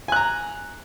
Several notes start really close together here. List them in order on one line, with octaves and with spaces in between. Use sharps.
G#5 F#6 A#5